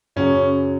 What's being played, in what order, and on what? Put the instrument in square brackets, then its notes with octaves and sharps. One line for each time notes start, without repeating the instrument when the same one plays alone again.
[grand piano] F#2 C#3 F#3 [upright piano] C#4